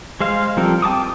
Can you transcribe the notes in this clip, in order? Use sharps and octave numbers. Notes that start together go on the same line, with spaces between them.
G#3 C5 F5
F3 G3 C4 A4 A#4
G5 A5 D6 D#6